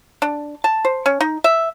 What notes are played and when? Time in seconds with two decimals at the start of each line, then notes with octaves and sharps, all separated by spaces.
0.22 D4
0.64 A5
0.85 C5
1.06 C#4
1.21 D#4
1.44 E5